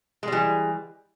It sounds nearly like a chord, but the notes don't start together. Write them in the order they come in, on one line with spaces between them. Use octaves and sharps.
G#3 G3 E3